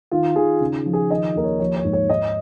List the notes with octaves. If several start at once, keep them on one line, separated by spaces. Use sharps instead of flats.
D#3 F4
D#3 G#4
C#3
F3
G#4
D#3 D#5
D#2 A#4
C#5
F3 C#5
C#5
G#2
C#5
G#2 D#5